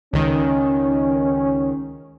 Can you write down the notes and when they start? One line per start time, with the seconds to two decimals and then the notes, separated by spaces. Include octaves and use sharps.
0.13 C#2 D#3 C#4